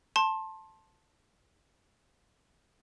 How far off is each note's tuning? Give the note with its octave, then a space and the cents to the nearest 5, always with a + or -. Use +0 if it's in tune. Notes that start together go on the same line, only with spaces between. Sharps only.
A5 +0 C6 +25